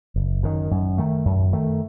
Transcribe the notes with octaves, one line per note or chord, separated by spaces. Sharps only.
F#1
F#2 D#3
F#2
D#3 A3
F#2
D#3 A3